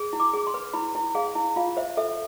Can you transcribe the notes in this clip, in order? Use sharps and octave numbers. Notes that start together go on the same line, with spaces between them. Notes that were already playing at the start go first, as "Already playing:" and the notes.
Already playing: G#4
E4
D6
G#4
C6
B4
E4 B5
E4
G#4 F5
E4
F4 F5
C5 E5
A4 E5